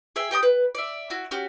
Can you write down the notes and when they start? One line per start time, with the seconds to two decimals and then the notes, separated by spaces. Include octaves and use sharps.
0.16 G#4 E5 G5
0.31 G4 G5 A#5 D#6
0.43 B4
0.75 D5 E5
1.10 E4 F#4
1.31 C#4 F#4 G4